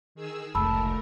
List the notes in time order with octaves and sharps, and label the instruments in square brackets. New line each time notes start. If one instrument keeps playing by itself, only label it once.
[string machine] D#3 G#4 E6
[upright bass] F1 C#2 [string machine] A3 A#4 [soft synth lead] A5 [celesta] B5 E6